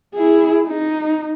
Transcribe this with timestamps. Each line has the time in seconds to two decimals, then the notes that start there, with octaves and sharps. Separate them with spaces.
0.14 E4 G#4
0.67 D#4